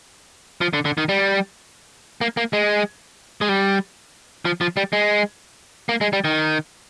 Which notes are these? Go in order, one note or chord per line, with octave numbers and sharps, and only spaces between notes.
F3
D3
D3
D#3
G3
A#3
A#3
G#3
G#3
G3
F3
F3
G3
G#3
A#3
G#3
G3
D#3